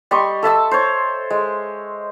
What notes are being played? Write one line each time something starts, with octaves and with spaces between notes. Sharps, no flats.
G3 D#5 C6 C#6
A4 E5 A5 E6
C5 C#5
G#3